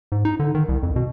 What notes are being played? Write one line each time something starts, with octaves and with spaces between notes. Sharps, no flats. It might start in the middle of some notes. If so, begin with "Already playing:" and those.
G#2
D#4
D3
D#3
C2
F2
B2